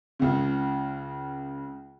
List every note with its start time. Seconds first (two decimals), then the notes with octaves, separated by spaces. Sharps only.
0.19 C#2 C#3